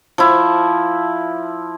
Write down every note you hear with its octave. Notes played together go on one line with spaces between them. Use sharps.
F3 E4